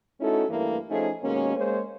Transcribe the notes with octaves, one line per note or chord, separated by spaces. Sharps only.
A3 C#4 D#4 E4 F#4 A4
G2 E3 A3 A#3 E4
F3 A3 C#4 D#4 G#4
D#2 B2 G#3 A#3 C#4
G#3 A#3 C5 C#5